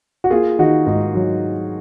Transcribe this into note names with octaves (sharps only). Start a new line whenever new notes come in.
F#4
A#3 F4 G#4
D#3 D#4 F#4
G#2 D#4
F#3